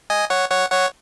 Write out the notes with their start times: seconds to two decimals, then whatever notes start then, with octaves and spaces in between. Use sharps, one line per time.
0.10 D#5 G#5
0.30 C#5 F#5
0.50 C#5 F#5
0.71 C#5 F#5